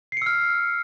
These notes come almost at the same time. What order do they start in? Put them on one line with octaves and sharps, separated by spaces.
C7 C#7 E6 F6